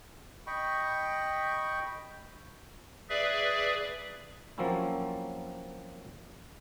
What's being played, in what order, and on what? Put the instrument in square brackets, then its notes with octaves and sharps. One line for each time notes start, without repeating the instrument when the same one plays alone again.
[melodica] D#5 G5 B5 C#6
[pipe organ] G#4 B4 D5 E5
[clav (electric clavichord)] F3 F#3 A#3 C4 C#4 E4